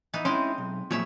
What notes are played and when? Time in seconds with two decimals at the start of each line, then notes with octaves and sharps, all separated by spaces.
0.13 E3 B3 D#4
0.25 G#3 C4 C#4 E4 C5
0.58 B1
0.91 A#2 C#3 F3 F#3 C#5 E5